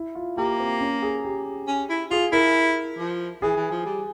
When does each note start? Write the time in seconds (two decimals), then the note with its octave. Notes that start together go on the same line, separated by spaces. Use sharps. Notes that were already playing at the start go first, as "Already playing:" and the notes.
Already playing: E4
0.15 F4
0.37 A#3 G4
0.60 C4
0.81 C#4
1.02 G#4
1.24 G4
1.67 C#4
1.90 E4
2.11 F4 G#4
2.32 E4 A#4
2.98 F3
3.42 E3 G#4
3.56 E3
3.71 F3
3.86 G3